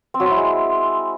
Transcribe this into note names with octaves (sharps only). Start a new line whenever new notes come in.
C4
F#3
C4
E4
G#3